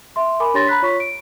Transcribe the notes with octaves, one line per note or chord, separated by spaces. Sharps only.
E5 C6
A#4 G#5 B5 D6
D4 G4 C#5 C6 A6 A#6
A#5 B5 F#6 B6
F4 C#5 C#6 B6
D7